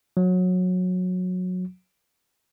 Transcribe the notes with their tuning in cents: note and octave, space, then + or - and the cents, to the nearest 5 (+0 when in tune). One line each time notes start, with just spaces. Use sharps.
F#3 -20